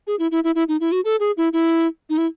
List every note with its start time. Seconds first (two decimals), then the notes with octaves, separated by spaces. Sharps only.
0.07 G#4
0.19 E4
0.31 E4
0.44 E4
0.55 E4
0.68 D#4
0.80 E4
0.92 F#4
1.05 A4
1.20 G#4
1.37 E4
1.53 E4
2.10 D#4
2.18 E4